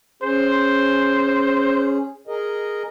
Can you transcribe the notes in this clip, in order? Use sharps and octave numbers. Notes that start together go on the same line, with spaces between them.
C#4 G#4 C5
G#4 A#4 D#5